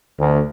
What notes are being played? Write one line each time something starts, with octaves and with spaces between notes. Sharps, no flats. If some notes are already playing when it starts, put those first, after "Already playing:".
D2